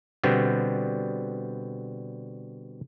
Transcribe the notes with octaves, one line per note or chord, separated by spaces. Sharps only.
B2 D3 G3 B3 C4